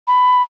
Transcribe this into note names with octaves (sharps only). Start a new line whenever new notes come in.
B5